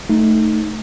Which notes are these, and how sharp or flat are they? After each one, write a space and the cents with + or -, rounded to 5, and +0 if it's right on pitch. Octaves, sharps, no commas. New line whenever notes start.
A3 +0 D#4 +0